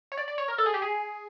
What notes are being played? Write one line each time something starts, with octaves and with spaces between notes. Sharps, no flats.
C#5
D5
D5
C#5
A#4
A4
G#4
G4
G#4